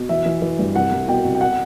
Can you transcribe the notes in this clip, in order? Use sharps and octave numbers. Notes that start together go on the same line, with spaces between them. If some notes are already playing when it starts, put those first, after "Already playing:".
Already playing: B2
E3 E5
E3
E3
G2
C2 F#5
C2
B2 G5
C2
G5
F#5